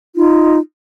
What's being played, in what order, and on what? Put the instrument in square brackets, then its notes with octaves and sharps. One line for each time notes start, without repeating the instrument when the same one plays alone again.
[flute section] D#4 F4